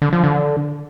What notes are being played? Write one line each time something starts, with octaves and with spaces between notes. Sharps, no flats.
D3
F3
D3